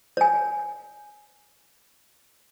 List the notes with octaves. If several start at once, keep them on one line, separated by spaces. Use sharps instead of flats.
C#5 G#5